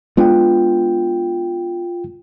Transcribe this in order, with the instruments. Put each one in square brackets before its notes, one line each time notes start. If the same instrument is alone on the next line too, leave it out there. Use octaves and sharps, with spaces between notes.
[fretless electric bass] G#3 B3 D4 [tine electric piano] F4 G5